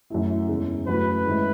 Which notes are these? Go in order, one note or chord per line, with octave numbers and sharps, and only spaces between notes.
F#2 D#3 A3 E4
E2 C#3 G#3
F#2 E3 A3 C#4 F#4 B4
G#2 D#3 A3 E4